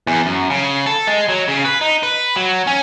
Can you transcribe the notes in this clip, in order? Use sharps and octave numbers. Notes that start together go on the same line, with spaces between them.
E2
F#2
C#3
A4
G#3
F#3
C#3
B4
D#4
B4
F#3
C#4